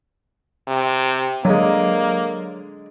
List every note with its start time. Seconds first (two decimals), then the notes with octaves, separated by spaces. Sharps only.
0.67 C3
1.45 D3 F#3 G#3 A#3